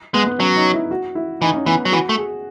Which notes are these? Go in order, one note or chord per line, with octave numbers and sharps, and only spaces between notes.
G#3 B3
B3
F#3 C#4
D#4
E4
F#4
E4
E3 D#4
C#4
E3 B3
F#3
E3 F#4
A3
G#4